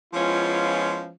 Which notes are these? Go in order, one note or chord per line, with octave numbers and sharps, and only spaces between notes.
F3 G#3 B3 C#4 E4 F4